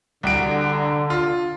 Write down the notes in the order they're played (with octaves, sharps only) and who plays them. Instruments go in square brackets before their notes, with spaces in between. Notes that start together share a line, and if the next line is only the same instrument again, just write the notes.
[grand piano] C2 F#4 D7 [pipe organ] D3
[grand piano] F4